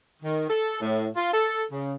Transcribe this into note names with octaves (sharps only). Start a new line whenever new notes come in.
D#3
A4
A2
F4
A4
C#3